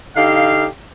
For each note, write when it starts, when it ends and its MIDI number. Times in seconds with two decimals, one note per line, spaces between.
0.16 0.66 50
0.16 0.66 63
0.16 0.66 67
0.16 0.66 77